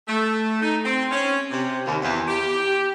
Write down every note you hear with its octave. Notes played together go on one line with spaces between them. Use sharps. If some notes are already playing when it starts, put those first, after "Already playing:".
A3
D#4
C4
C#4
C3
D#2
E2
G4